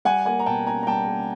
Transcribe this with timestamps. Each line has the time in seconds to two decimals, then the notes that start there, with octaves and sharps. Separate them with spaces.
0.05 G3 F#5 G#5
0.26 A#3 F#5 G#5
0.40 A#5
0.46 B2 G5 A5
0.66 C#4 G#5 A#5
0.83 A#5
0.87 G3 G5 A5
1.08 A#3